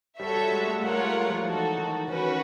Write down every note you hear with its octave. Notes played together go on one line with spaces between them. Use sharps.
G3 F#4 A4 C#5 E5
G3
G#3
A3
G#3 F4 A#4 C#5 F#5
G3
G#3
G3
F3
E3 D#4 F#4 A4
D#3
D#3 C#4 F#4 B4